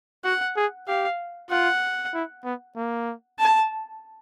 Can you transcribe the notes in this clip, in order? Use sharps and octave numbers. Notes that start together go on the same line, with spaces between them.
F#4 F#5
G#4
G4 F5
F4 F#5
E4
B3
A#3
A5